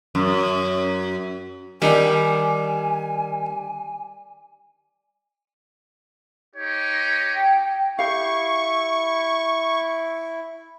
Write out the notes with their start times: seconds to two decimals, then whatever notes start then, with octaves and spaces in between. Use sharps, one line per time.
0.15 F#2
1.82 D3 D#3 G3 G#5
6.55 D#4 G4 C#5
7.35 G5
7.99 E4 G4 F5 C#6